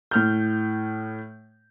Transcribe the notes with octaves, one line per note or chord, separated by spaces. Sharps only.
A2 F6 G6